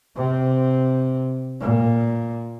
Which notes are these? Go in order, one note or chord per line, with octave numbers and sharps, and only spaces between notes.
C3 C4
A#2